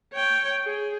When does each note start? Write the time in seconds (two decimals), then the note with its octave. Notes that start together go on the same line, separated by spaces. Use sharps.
0.13 C#5 G5
0.64 G#4